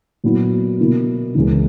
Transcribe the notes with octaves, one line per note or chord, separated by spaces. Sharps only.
A#2 F#3 B3 E4
B2 A#3 E4
C#2 C#3 E3 A#3